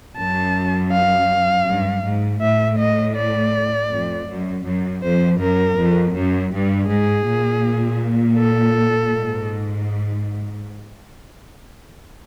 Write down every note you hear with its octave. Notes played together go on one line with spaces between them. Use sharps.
F#2 A5
F5
G2
G#2
A2 E5
D#5
D5
F2
F#2
F#2
F2 C5
F#2 A#4
F2
F#2
G2
G#2 G#4
A#2
A4
G#2